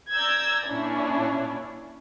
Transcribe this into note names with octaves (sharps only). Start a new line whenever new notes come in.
D5 A#5 E6 G6 G#6
A#2 C#4 D4 E4